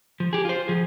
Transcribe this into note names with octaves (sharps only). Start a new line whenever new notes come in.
F3
G4 G#4
F4 C5
F3 G#4